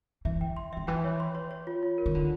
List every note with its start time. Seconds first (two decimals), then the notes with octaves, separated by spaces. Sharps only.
0.25 E3 E5
0.41 G5
0.57 C6
0.73 D#3 E5
0.87 E3 G5
1.04 C#5
1.20 C6
1.35 C#5
1.51 C#5
1.67 F4
1.83 F4
1.98 A#4
2.06 D#3
2.15 D3 F4